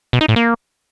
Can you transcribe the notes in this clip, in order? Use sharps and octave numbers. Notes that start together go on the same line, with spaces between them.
B2
D#4
A2
A#3